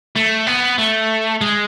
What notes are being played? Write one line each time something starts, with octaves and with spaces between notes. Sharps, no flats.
A3
B3
A3
G#3